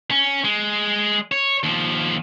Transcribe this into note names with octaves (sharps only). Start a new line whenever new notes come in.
C#4
G#3
C#5
D#2 F3